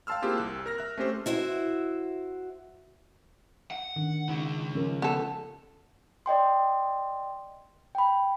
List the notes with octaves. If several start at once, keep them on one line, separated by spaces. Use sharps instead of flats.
F5 G5 A5 C6 E6 F6
A#3 C4 E4 F4 G4 G#4
C2 F#6
A#4 F6 A#6
E5 F#6
A3 C4 C#4 G4 C5
E4 F#4 C5 E5
F#5
D#3 D4
C#2 C#3 D#4
F3 C#4 A#4
B3 A4
D5 D#5 G5 C6
G5 B5